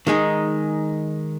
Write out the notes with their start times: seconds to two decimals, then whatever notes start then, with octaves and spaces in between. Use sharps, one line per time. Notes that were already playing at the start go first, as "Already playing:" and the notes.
0.07 D#3 G#3 D#4 G#4